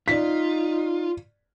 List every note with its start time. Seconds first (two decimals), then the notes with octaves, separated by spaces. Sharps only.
0.08 D#4 F4 D5 B6